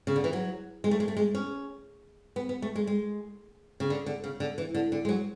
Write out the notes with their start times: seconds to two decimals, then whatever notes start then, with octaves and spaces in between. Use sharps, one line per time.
0.07 C#3
0.16 D3
0.24 E3
0.33 F#3
0.84 G#3
0.91 A3
1.00 G#3
1.08 A3
1.17 G#3
1.35 C#4
2.36 B3
2.49 B3
2.62 A3
2.75 G#3
2.87 G#3
3.80 C#3
3.90 D3
4.06 D3
4.24 C#3
4.40 D3
4.58 E3
4.75 D3
4.92 D3
5.05 G#3
5.09 F#3